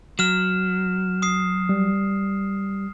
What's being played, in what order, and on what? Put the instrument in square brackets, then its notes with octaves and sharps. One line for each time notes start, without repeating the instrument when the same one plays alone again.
[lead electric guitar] F#3 [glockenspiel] F6 E7
[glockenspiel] D#6 C7
[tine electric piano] G3